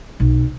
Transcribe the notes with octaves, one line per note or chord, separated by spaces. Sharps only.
B1